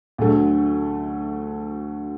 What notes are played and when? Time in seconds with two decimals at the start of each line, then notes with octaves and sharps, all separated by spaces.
0.18 D2 D3 F#3 A3